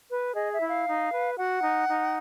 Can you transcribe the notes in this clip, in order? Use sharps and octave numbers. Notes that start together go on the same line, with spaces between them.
B4
G#4 D#5
E5
E4
F5
D#4
B4
F#4 F#5
D#4
D#4